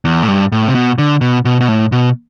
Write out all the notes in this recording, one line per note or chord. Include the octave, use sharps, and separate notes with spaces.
E2
A2
G2
A2
C3
B2
D3
B2
B2
B2
A2
B2